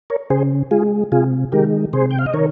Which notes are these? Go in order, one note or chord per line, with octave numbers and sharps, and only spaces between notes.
A#4 C#5
C#3 G#4 C5
G#3 F4 G#4
C3 F4 G#4
D#3 G#3 G4 A#4
C3 G#4 C5
G5
F5
D#5
D#3 A#4 C#5